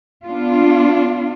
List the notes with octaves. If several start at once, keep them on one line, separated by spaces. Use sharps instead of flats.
B3 D4 F4